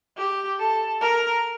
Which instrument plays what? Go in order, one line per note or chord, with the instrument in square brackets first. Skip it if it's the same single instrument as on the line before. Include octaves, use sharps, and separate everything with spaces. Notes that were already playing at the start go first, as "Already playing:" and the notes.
[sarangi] G4
A4
A#4